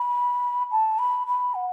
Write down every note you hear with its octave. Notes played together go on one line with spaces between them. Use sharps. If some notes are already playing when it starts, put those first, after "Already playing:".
Already playing: B5
A5
B5
B5
F#5